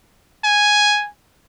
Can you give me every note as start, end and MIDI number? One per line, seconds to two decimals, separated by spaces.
0.44 1.08 80